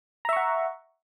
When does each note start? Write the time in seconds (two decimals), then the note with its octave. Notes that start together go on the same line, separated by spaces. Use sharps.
0.25 A#5
0.29 E5
0.33 C#6
0.37 F#5